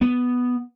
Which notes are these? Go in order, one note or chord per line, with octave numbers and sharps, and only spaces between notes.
B3